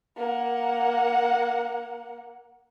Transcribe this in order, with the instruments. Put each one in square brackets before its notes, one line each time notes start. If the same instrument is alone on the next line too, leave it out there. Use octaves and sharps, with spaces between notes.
[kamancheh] A#3 F#5